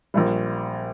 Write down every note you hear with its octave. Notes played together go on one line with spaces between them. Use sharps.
A#1 A#2 G3